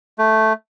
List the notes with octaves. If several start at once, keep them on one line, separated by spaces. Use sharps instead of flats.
A3